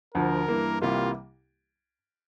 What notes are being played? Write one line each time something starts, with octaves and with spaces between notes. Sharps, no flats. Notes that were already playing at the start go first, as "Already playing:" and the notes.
D2 D3 F3 A#4
G2 E3 A#3
C2 C3 E3 G3 A#3 F4